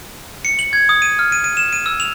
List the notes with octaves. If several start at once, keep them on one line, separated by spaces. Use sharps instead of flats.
C#7
F#7
G#6
D#6
D#7
F6
D#7
D#7
E7
D#7
E6
F7